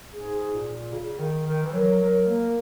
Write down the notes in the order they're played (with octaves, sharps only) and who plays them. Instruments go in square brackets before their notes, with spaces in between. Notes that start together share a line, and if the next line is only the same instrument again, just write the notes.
[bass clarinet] G#2 [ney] G#4
[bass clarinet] A#2
C#3
D#3
D#3
E3
[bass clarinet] F#3 [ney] A#4
[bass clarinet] F#3
A#3